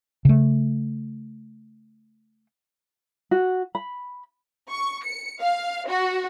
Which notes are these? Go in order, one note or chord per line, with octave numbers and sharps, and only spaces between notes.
C#3 A3
F#4
B5
C#6
C#7
F5
F#4